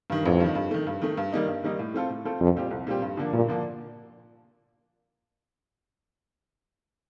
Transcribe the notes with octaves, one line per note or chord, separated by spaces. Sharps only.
G2 D#3
A1 F2
G2 D#3
G2
D#3 A3
G2
D#3 A3
G2
D#3 G3 A#3 D#4
G2
D#3 G3 A#3 D#4
A2
A3 C4 F4 A4
A2
A3 C4 F4 A4
C2 F2
A#2 G3 C4 G4
C2
A#2 G3 C4 G4
G2
D3 F3 A#3 D4
G2 A#2
D3 F3 A#3 D4